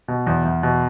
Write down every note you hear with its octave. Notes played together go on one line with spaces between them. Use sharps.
B2
E2
E2
B2